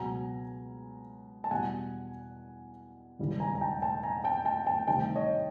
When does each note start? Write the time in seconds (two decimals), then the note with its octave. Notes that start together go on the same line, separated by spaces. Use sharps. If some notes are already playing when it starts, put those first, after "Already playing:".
Already playing: C#2 B2 F#3 G#5 A#5
1.44 A5
1.51 E2 B2 G3 F#5 G#5
3.19 E1 D#2 C#3 E3 G3
3.40 G#5 A#5
3.55 A#5
3.61 G5 A5
3.82 G5 A5
4.03 G#5 A#5
4.24 G5 A5
4.45 G5 A5
4.66 G5 A5
4.87 D2 C3 D#3 G3 G5 A5
5.16 C#5 D#5